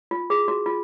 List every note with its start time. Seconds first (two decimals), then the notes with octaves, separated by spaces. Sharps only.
0.11 F4
0.30 G#4
0.48 F#4
0.66 F4